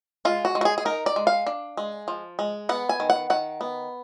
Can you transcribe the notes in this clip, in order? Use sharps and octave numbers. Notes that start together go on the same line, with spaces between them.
G#3 F4
F#4
G#3
F#4
G#4
G#4
D#4 A#4
D5
G#3
F5
D4
G#3
F3
G#3
B3 F#5
G#5
D#3
F#5
D#3 F#5
B3